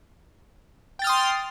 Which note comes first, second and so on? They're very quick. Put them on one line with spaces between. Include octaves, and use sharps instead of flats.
G5 A6 F6 D#6 C6